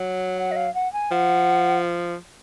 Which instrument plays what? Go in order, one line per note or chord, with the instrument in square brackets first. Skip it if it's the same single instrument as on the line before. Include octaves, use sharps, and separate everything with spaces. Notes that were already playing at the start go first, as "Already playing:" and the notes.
Already playing: [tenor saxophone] F#3
[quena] F#5
D#5
F5
F#5
G#5
[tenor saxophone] F3 [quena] F#5